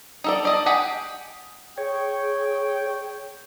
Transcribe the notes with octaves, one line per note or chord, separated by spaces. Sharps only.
D#4 A4 D5
D5 D#5 A5
G4 G#4 D#5 F#5
G#4 C#5 G5